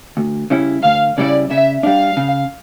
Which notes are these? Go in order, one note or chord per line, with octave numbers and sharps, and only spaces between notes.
D2
C#3 G3 C#4 E4
D2 F5
C#3 G3 C#4 E4 D5
C#3 E5
G3 D4 F5
C#3